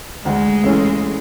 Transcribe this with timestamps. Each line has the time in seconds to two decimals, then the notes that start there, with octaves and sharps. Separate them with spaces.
0.25 D2 G#3
0.63 C#3 E3 A3 C#4